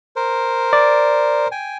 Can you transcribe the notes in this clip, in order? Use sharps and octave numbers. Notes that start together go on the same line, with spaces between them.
A#4 C5
D5
G5 G#5